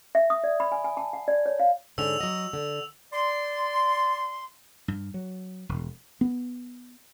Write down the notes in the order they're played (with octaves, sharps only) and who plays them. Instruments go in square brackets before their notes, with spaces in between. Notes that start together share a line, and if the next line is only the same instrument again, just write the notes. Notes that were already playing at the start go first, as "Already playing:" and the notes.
[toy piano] E5
D#6
D5
B5
G#5
G#5
A5
F#5
D5
C#5
F5
[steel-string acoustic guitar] G#2 D3 C#4 [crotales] E6 F7
[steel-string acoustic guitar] F#3 D#5
D3
[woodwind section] D5 C6
[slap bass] G2
F#3
E1
[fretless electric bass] B3